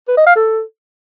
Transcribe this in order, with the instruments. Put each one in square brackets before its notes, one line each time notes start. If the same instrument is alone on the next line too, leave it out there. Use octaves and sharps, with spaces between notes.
[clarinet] B4
D#5
F5
A4